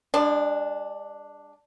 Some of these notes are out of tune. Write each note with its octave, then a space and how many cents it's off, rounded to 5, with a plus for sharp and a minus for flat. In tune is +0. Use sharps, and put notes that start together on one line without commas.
G#3 -40 D4 +0